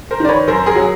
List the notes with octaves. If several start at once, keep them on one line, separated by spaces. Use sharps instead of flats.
A#4 C5
D#3 D5
B4 C#5
F#2 A#4 C5
G#4 A#4
F#3